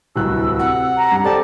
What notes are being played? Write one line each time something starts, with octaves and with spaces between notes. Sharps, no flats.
D1 C2 E6 F#6
C3 F#5
A#5
G2
G4 A4 C5 D5 A5